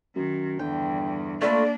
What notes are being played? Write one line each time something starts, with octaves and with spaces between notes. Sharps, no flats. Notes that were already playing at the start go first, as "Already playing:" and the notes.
F#2 D#3
E2 G2 D3 G5
A3 A#3 D4 F4 B4 D5